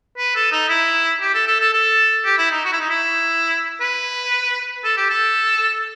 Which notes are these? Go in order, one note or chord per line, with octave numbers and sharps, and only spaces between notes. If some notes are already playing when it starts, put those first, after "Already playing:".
B4
A4
D#4
E4
G4
A4
A4
A4
A4
G4
E4
D#4
F#4
E4
D#4
E4
B4
A4
G4
A4